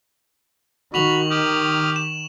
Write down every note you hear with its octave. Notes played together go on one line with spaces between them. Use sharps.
D#3 F#4 B5 C#6 F7 F#7
G4 D#6 F6
E7